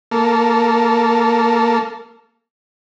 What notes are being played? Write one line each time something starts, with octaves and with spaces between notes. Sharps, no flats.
A#3 A4